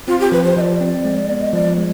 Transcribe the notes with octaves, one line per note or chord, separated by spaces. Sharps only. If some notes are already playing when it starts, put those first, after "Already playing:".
C4 F4
G4
F3 B4
C5
F3 D5 D#5
C4
G#3
B3
D#5
F3 D5
G#3